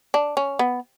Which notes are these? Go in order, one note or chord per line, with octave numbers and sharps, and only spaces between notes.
D4
C#4
B3